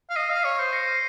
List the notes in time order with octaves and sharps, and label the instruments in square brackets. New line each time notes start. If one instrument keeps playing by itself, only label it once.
[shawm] F5
[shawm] D#5 [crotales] C7 D#7
[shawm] F5
C#5
[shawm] C5 [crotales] C7
[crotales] A#6 C#7
C7 D#7